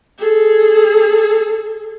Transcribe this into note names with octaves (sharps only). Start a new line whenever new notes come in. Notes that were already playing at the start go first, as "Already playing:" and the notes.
G#4 A4